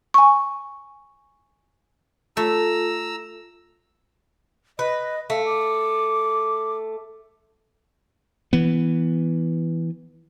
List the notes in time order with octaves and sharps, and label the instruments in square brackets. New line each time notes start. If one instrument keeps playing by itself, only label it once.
[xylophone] G#5 C#6
[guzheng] A3 [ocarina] F4 [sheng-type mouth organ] A#5 E6
[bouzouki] B4 [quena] D#5
[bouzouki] A3 [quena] F5
[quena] D6
[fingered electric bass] E3 B3